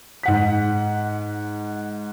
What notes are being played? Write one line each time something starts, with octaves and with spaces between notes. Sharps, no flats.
G#2 F#5 B6